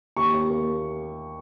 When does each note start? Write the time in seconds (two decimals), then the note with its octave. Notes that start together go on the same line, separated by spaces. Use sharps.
0.17 D#2 C#6
0.33 D#2
0.50 A#3